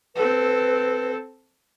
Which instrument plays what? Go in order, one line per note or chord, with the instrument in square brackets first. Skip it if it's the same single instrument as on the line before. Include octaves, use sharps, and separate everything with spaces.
[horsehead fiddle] C4 A4 [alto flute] B4